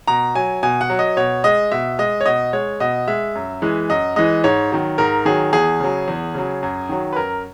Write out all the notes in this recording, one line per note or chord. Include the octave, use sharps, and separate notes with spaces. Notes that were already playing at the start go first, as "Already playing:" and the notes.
B2 A#5
F#3 G#5
B2 G#5
F#5
F#3
D#5
B2 C#5
G#3 D#5
B2 E5
G#3 D#5
C#5
B2 D#5
G#3 C#5
B2 D#5
G#3 E5
F#2
E3 G#3
F#2 D#5
E3 G#3 D#5
G#2 C#5
D#3 F#3
G#2 A#4
D#3 F#3 G#4
E2 G#4
C#3 F#3
E2
C#3 F#3
F#2
D#3 F#3
B4
F#2 A#4